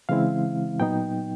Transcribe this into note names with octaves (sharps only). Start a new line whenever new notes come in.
C#3 E3 G#3 C4 E4 F5
A#2 F#3 B3 D#4 G5